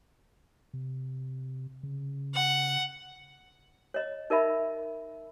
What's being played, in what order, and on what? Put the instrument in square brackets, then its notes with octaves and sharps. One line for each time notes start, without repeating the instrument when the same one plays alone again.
[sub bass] C3
C#3
[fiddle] F#5
[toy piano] C#5 D#5
D#4 A#4 D5 E5 B5